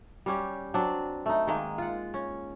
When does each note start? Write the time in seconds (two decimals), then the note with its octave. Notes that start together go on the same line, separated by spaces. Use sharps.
0.26 G3 C#4 G4
0.74 F#3 C4 D4
1.26 A3 D#4
1.47 D#3 G#3 A#3
1.78 F4 F#5
2.14 C#4